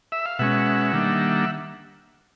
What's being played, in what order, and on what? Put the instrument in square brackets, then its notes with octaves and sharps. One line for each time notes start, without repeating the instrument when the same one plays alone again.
[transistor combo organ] E5
F5
B2 G#3 C#4 E5 F#5
D#3 G3 A#3 D4